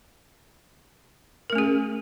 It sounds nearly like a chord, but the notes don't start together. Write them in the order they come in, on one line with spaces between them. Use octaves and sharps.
A#4 A3 C#4 G#4